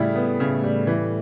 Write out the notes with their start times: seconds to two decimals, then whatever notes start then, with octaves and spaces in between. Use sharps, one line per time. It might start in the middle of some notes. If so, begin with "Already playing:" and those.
Already playing: A2 C#3 G3 A3 E4
0.16 B3
0.40 C#3
0.64 G3
0.87 E3